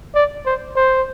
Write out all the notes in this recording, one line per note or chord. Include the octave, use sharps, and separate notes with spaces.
D5
C5
C5